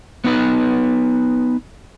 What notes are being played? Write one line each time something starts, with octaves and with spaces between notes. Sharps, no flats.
B3 D#4 B4